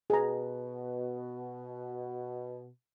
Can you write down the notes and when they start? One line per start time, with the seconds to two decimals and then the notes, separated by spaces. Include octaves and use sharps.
0.10 B2 G#4 A#5